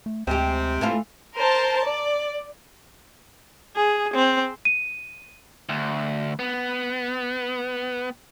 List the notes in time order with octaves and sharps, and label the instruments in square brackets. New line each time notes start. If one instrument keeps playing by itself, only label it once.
[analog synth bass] A3
[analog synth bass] D2 [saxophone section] C3 C4 [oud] G#3 G4
[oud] E3 A3 F4
[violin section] A#4 C5 A5
D5
[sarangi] G#4
C4
[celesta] D#7
[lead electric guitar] D2
B3